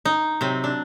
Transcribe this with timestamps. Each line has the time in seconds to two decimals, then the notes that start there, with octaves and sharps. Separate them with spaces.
0.05 D#4
0.41 C3 F#3 C4
0.64 D4